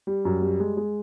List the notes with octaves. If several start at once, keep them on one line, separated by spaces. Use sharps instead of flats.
G3
F#2
G3
G#3
G#3